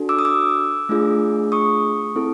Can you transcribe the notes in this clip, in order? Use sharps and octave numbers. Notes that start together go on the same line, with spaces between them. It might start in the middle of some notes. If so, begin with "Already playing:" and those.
Already playing: D4 F#4 A4
D6 E6
D#6
D6 E6
A3 D4 F4 G#4
C#6 D#6
C4 E4 A4